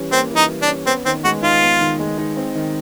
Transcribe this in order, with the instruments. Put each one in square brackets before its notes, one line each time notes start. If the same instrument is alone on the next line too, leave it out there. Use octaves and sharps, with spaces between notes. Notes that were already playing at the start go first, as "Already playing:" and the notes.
Already playing: [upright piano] E3 G3 C#4
[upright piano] A#3 [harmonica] C4
[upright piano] E3
[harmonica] D#4
[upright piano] G3
[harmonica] D4
[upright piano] C#4
[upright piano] B3 [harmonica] C4
[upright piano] D#3 [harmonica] C4
[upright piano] G#3 [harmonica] F#4
[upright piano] D#4 [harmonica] F4
[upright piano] B3
D#3
G#3
D#4
C4
D#3